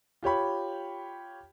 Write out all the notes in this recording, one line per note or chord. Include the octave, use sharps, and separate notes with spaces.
F4 G4 C#5 B5